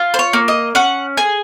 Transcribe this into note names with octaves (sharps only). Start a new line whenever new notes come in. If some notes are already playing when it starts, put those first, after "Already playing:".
Already playing: F4
C5
C#5
A#3
D#5
C#4 F#5
G#4 G#5